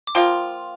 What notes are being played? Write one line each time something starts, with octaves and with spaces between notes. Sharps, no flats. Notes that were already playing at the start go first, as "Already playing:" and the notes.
D6
F3 A#3 F4 G5 C6